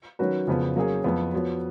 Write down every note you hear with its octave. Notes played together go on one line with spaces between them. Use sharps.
D#3 F#3 C#4 F#4 B4
F2 C#3 F3 B3
F#3 A#3 C#4 G#4 C#5
F2 F3 B3 F4
F3 B3 F#4 C#5